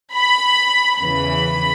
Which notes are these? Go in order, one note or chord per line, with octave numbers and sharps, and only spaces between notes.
B5
E2 C#3 E3 B5